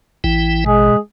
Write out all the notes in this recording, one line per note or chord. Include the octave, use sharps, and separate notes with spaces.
A1 E3 E4 G5
B2 G#3 G#4